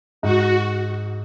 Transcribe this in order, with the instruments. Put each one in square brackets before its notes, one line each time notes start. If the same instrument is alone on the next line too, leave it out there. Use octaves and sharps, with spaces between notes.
[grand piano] G#2 [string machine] F#4